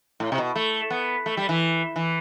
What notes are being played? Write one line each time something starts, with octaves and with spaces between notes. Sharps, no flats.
A2
C3
B2
A3
B3
A3
G3
E3
E3